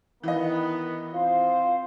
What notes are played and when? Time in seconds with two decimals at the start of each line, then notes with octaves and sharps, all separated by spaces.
0.23 D#3 E3 B3 D#5
1.13 C4 F4 C5 F5